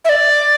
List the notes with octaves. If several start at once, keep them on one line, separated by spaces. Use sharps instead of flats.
E5
D5